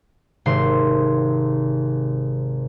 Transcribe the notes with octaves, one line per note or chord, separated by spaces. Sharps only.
G#1 C3 C6